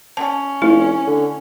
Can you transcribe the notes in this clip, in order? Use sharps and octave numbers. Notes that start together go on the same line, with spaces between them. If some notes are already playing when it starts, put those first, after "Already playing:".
C#4 A5
F1 A3 E4
D3